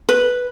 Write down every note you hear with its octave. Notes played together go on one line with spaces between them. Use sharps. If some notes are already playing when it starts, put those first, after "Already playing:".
B4